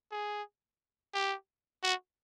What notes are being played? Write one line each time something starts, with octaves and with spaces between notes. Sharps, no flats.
G#4
G4
F#4